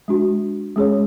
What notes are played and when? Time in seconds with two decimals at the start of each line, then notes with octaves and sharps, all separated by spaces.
0.08 G#3 D4 F#4
0.76 G#3 C#4 G#4 C#5